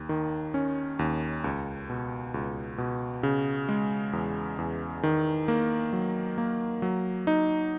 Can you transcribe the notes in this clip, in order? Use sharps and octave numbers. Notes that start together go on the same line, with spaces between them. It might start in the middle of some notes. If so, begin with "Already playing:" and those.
Already playing: D#2
D#3
C#4
D#2
C#2
B2
C#2
B2
C#3
G#3
E2
E2
D#3
A#3
F#3
A#3
F#3
D#4